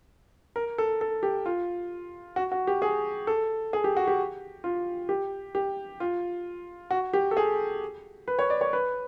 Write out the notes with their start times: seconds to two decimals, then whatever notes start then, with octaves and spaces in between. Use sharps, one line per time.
0.56 A#4
0.78 A4
1.01 A4
1.23 G4
1.46 F4
2.36 F#4
2.52 F#4
2.67 G4
2.82 G#4
3.27 A4
3.73 G#4
3.84 G4
3.97 F#4
4.07 G4
4.64 F4
5.09 G4
5.55 G4
6.00 F4
6.91 F#4
7.13 G4
7.31 A4
7.37 G#4
8.28 B4
8.39 C#5
8.50 D5
8.61 C#5
8.73 B4